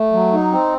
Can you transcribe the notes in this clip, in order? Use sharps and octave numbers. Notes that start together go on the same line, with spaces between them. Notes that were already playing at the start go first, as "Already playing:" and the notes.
Already playing: A3
F#3
D#4
C4